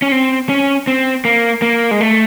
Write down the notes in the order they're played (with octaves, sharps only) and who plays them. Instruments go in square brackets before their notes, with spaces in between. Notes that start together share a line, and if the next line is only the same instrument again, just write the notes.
[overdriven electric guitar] C#4
C4
C#4
C4
A#3
A#3
G#3
A3